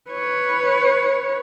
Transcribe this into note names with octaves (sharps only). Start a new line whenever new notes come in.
B4 C#5